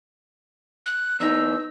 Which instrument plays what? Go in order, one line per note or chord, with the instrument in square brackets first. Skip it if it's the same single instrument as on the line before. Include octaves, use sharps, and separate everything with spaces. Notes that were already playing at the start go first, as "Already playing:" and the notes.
[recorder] F#6
[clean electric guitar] E2 D#4 [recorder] E6